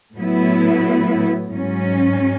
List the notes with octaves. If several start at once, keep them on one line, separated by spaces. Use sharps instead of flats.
A2 F#3 B3 E4
G#2 F#3 C#4